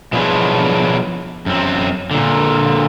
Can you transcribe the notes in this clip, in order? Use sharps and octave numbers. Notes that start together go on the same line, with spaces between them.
B2 F3 F#3 D4 E4 G#4
F#2 C4
A#2 D3